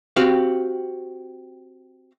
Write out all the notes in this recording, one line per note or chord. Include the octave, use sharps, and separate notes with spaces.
C4 F#4 G4 F5